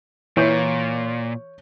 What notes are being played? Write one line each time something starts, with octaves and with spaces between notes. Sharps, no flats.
A#2 E3 C#5 G6